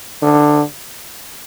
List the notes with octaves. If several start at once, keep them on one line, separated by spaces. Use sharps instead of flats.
D3